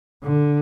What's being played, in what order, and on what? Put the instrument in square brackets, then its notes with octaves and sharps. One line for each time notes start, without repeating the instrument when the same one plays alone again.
[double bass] D3